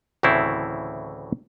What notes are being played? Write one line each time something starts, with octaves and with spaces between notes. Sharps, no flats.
D2 A2 C#3 E3 C4 E4